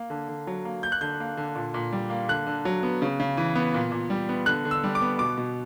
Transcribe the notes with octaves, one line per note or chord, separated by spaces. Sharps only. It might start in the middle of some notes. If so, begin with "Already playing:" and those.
Already playing: A#3
D3
D3
F#3
A#3
A#3 G6
F#6
D3 G6
A#3
D3
A#2
A#2
G3
A#3
D3 F#6
D3
F#3
B3
C#3
C#3
E3
B3
A#2
A#2
G3
B3
D3 F#6
D3
E6
G3
D6
B3
B2 D6
B2